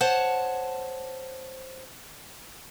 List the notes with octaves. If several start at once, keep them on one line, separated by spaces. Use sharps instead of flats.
C5 C#5 F#5 A5